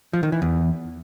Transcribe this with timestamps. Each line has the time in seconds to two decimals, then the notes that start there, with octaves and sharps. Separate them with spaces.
0.13 F3
0.23 D#3
0.32 E3
0.42 E2